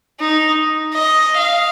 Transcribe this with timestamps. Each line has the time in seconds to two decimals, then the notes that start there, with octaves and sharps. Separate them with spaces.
0.20 D#4
0.94 D#5
1.38 F5